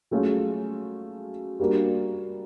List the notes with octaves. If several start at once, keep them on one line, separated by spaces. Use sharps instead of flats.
F#3 A3 C#4 F4 G#4
G3 A#3 D4 F#4